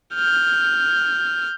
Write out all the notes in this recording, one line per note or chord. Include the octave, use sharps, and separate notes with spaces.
F6 G6